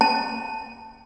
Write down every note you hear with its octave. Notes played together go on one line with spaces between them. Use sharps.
A5